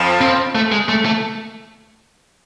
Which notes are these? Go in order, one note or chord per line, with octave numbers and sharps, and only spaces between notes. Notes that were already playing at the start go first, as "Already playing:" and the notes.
Already playing: F2 F3
C4
A3
G#3
A3
A3